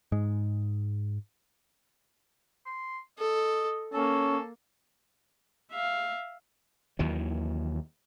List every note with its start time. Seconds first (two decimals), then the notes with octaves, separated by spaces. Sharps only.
0.12 G#2 G#3
2.66 C6
3.19 A4 D#5
3.94 A#3 C#4 A4
5.71 E5 F5
6.99 D#2 D#3 E3 F#3